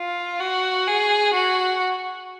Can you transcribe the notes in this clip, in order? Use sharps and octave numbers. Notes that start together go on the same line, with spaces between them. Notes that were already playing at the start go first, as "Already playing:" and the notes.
Already playing: F4
F#4
G#4
F#4